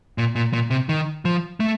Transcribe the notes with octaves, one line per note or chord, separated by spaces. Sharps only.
A#2
A#2
A#2
C3
D#3
F3
A3